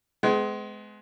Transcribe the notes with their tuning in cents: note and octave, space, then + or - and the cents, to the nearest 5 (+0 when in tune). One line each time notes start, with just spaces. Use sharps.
G#3 +20 B3 +45